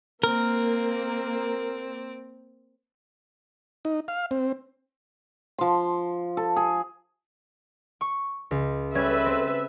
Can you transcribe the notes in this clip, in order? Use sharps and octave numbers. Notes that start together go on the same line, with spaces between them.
A#3 C4 A#4
D#4
F5
C4
F3 C6
A4
G#4
C#6
C#2
G3 C#4 A4 B4 E5 G#6
C4